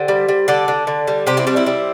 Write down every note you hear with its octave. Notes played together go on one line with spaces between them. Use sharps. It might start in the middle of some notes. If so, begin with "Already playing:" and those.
Already playing: D3 G4 C5
G3
G3
D3 A4 D5
D3
D3
G3
C3 G4 C5
C4 E4
G3 D4 G4
C4 E4
G3